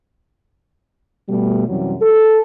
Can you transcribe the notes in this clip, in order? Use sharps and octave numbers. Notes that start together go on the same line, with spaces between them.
B2 G3 A3
F#2 C3 E3 F#3 G3
A4